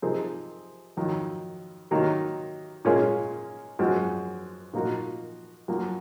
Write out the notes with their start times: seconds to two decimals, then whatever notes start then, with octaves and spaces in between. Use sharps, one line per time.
0.02 C3 F3 C4 D#4 G#4
0.97 F2 D#3 F#3
1.91 C3 D#3 F#3 A#3 D#4
2.85 A#2 G#3 C#4 F4 G#4
3.79 F#2 F3 G#3 C4 F#4
4.73 A#2 F3 A#3 D#4 F#4
5.68 F#2 F3 A#3